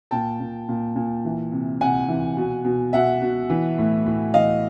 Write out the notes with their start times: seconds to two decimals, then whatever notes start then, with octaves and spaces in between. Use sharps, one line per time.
0.11 A#2 G5 A5
0.40 A#2
0.68 A#2
0.96 A#2
1.25 E3
1.52 C3
1.81 C3 F#5 G#5
2.08 E3
2.37 B2
2.65 B2
2.93 B2 E5 F#5
3.22 B2
3.50 E3
3.78 A2
4.06 A2
4.34 E3 D#5 F5